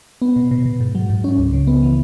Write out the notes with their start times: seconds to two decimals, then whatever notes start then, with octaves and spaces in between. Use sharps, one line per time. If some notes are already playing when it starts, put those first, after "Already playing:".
0.22 B3
0.36 B2
0.51 B2
0.65 B2
0.80 G#2
0.95 F#3
1.10 G#2
1.24 C#4
1.38 C#2
1.53 C#3
1.67 B3
1.83 E3